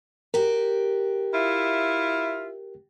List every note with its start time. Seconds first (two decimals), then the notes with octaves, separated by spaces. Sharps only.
0.34 F#4 G4 A#4
1.33 E4 F4 E5